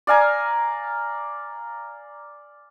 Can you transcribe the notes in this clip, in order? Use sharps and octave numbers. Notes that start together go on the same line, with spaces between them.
D5 F5 G#5 A#5